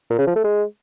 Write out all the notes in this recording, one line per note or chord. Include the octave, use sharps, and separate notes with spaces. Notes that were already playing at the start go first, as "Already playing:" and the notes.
A#2
C#3
F3
A3
G#3